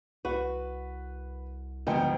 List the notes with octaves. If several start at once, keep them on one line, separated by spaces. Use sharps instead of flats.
C2 F#4 B4
D2 G#2 F3 G3 B3 G5